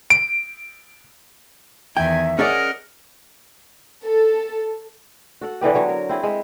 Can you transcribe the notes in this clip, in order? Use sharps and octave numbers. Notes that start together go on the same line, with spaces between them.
D7
E2 D#3 E5 G5 G#5
C#4 G#4 A#4 D5 D#5 F#5
A4
F#4 A4 F#5
D3 E3 B3 G4
D3 F#3 C#5
A#4
C4 E4 G#4
G#3 E5